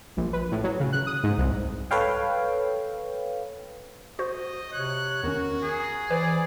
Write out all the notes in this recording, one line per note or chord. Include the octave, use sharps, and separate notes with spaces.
A#1
B4
A2
F#3
C#3
F#6
D#6
G#2
C2
A4 B4 C#5 F5 G5
F#4 C5 D#5
C3 C#5 F#6
E2 D#3 C#4 F#4 A#4
G#4
E3 B4 C5 D5